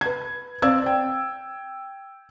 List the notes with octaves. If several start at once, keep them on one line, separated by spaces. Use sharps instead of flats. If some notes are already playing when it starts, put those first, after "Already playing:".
B4 G#6
C4 D5 F5 E6 G#6
G5